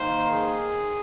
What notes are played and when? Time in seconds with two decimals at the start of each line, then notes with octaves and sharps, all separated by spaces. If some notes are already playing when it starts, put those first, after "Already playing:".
Already playing: D#3 A#3 C5
0.30 G#4